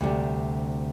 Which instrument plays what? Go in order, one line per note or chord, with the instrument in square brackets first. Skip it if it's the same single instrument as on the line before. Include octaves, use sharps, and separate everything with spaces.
[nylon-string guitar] D2 C3 G3 D4